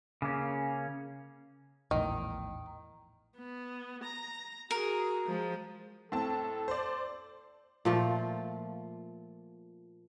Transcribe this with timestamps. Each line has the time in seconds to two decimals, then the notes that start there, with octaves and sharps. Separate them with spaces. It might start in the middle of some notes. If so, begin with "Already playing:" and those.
0.22 C#3 A#3 C#4
1.91 A#1 E2 A2 D#3
3.38 B3
4.03 A#5
4.71 F#4 G#4 A#4
5.27 F3 G#3
6.12 A2 C4 A4 A5
6.68 C5 D5
7.85 A#2 F3 A3